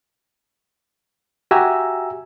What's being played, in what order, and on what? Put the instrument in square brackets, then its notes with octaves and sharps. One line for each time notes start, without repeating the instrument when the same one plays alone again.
[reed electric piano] F#4 G4 E5 G#5 A#5 E6